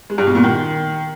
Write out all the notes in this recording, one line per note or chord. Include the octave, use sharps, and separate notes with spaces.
G#3
G2
B2
A#2
D#3